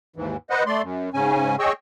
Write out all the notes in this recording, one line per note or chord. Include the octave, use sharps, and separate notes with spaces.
D#2 G#2 E3
B4 C5 D#5 F#5
A3 D5 C6
F#2
G#2 C#3 C#4 G#5
G#4 C#5 D#5 G5 C#6 E6